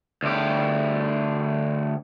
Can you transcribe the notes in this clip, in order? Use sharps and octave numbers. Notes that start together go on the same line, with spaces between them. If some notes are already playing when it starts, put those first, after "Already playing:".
D2 G4